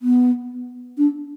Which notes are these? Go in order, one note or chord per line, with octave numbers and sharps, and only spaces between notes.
B3
D4